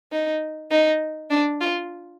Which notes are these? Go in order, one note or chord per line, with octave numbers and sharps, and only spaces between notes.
D#4
D#4
D4
F4